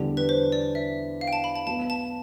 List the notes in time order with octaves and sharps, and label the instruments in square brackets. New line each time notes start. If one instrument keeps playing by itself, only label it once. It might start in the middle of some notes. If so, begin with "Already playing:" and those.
Already playing: [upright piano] E2 D3 G3
[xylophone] B4
C5
D5
E5
F5
G5
A5
B5
A5
[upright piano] B1 B2 B3 [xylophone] A5
[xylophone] A5